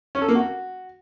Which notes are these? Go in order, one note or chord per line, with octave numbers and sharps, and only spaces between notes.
C#4
A4
A#3
F#4